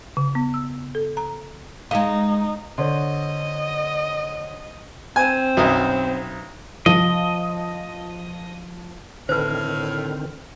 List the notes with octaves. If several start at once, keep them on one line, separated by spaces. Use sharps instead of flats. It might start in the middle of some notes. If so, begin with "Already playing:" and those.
C#3
B3
E6
A4
A#5
G#3 D#4 D#5 F5
D3 C5 C#5 D#5 C6
C4 G#5
B1 F#2 D#5
F3 D#5
A2 D3 D#3 C4 B4 C5 F6